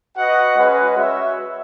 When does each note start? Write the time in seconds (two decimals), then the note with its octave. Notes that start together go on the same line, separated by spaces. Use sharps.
0.17 F#4 B4 D#5 F#5
0.57 G#3 C#4 F#4 B4 D#5
0.97 F#4 C#5 E5